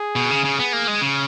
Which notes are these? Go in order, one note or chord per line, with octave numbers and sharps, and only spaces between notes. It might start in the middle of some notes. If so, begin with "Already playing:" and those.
Already playing: G#4
B2
C#3
C#3
B3 G#4
A#3
G#3
C#3